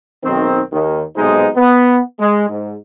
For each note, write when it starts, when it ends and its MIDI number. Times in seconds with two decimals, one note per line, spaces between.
0.24 0.60 35
0.24 0.60 51
0.24 0.60 60
0.72 1.02 39
0.72 1.02 51
1.17 1.47 35
1.17 1.47 48
1.17 1.47 56
1.17 1.47 59
1.17 1.47 63
1.17 1.47 72
1.56 1.99 59
2.19 2.49 56
2.49 2.75 44